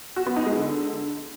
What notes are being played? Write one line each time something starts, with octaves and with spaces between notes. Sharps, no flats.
F#4
B3
D#4
G#3
D3